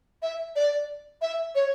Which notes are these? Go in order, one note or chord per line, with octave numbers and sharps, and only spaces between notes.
E5
D5
E5
C#5